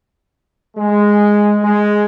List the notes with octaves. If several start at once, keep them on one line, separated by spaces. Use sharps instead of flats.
G#3
G#3